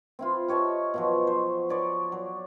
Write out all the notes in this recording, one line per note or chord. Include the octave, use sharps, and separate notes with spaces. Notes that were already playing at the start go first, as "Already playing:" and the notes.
C4 E4 F4
G4 C#5 D#5 A5
B2 F3 F#3
C5
C#5 D5 B5
F#3